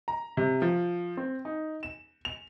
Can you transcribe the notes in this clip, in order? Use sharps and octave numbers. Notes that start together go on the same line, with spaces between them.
A#5
C3
F3
C4
D#4
E7
F7